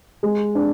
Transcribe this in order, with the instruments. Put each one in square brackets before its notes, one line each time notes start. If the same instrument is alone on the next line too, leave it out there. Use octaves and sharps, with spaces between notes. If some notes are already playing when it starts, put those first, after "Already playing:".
[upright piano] G#3
D4